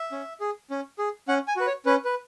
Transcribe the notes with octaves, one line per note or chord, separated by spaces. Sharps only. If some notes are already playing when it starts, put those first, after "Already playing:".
Already playing: E5
C#4
G#4
C#4
G#4
C#4 F#5
G#5
F#4 B4
C#5
C#4 B4
B4